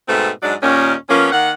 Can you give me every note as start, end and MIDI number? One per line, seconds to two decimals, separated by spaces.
0.08 0.30 44
0.08 0.30 47
0.08 0.30 57
0.08 0.30 60
0.42 0.54 44
0.42 0.54 54
0.42 0.54 56
0.42 0.54 62
0.42 0.54 74
0.62 0.94 39
0.62 0.94 46
0.62 0.94 51
0.62 0.94 61
1.09 1.31 53
1.09 1.31 58
1.09 1.31 59
1.09 1.31 61
1.32 1.51 51
1.32 1.51 58
1.32 1.51 78